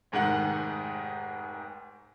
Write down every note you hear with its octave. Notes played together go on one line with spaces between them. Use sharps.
F1 G#2 D#3 F#5